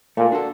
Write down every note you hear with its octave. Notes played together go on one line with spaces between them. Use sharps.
A#2 A3
D4 F#4 A4